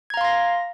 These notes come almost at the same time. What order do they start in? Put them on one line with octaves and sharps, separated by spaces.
G#6 A#5 F5 C6 A#6